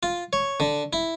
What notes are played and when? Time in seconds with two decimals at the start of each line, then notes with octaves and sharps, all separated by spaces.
0.03 F4
0.33 C#5
0.60 D3
0.93 E4